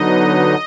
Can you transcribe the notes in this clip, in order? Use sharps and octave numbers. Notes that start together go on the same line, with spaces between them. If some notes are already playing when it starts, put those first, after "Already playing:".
Already playing: D3 F#3 B3 D#4 D#5